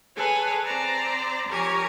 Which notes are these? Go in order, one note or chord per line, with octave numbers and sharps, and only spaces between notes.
G#4 A4 B4 C#5 G#5
C4 C5 D5 A#5
F3 G4 A#4 C#5 G#5 A#5